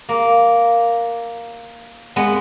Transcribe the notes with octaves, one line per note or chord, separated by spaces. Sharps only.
A#3
G#3 B3